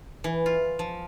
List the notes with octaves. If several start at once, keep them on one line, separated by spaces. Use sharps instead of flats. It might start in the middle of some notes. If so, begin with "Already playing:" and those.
E3
F4
F3